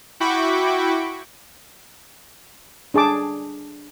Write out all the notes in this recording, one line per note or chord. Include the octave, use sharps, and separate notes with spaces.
E4 F#4 G5 B5 C#6 D6
D4 G#4 A5 D6